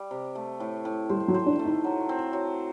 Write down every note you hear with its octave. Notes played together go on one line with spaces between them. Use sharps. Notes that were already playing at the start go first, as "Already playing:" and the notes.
Already playing: G3
C3
A3
A2
A2
G3 C5
F#3
C5
D4
A3
D#4
F#3
C4
F#3